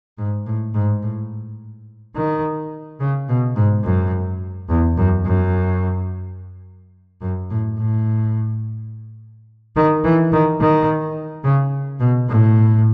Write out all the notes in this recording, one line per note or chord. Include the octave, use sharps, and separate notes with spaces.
G#2
A2
G#2
A2
D#3
C#3
B2
G#2
F#2
E2
F#2
F#2
F#2
A2
A2
D#3
E3
D#3
D#3
C#3
B2
A2